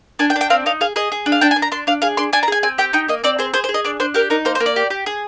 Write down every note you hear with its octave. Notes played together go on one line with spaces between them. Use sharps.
D4 G#5
G5
D4
G5
C4 F5
D#4 F5
G#4 F5
G#4 D#5
G#4
D4
F5
D4 G5
G#5
D4
A#5
D4 C6
D4 F5
G#4 F5
D4 C6
D4 G#5
A#5
G#4 G#5
C4 G#5
G4 G5
D#4 G5
A#3 D#5
C4 D5
G#4 C5
G#4 C5
C5
G#4
D#5
D4 D5
D4 C5
G4 A#4
D#4 A#4
A#3 C5
C5
A#3
D5
G4
G4
G#4